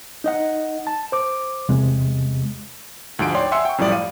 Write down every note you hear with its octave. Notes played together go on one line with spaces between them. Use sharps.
D#4 D#5 F#5
A5
C5 D6
E2 C3 G#3
D2 G#2 F3 D7
C#5 D5 G5 C6
E5 F#5 G#5 C6 E6 C#7
G5 C#6
F#2 A2 F3 G3 D5 D6
F5 D#7